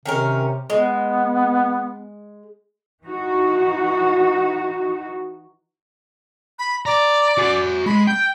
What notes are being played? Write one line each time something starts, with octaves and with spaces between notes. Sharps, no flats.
C3 D#3 C#4 A#4
G#3 B3
E3 D#4 F#4
B5
D5 A#5
F#4 G#5
G#3 B5
G5 G6